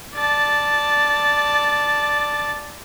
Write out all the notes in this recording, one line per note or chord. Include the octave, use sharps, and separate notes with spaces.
D5 A5